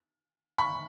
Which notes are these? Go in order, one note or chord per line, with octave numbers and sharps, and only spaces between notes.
B5 C#6